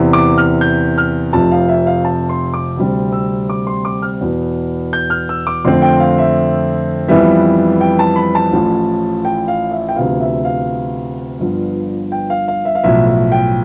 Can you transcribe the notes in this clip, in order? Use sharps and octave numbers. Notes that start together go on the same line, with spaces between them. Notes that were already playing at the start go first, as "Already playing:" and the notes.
Already playing: E2 C3 E3
D6
F6
G6
F6
F1 F2 C3 F3 A5
F5
E5
F5
A5
C6
D6
D2 C3 G3 C4
E6
D6
C6
D6
F6
E2 B2 B3
G6
F6
E6
D6
F2 D3 A3 C4 C6
G5
F5
E5
F2 E3 G3 B3 E5
G5
A5
B5
A5
A1 A2 F3
G5
F5
E5
G5
D2 C3 F3 B3 F5
E5
F5
G1 G2 F3
G5
F5
F5
E5
F5
B1 A2 F3 E5
E5
G5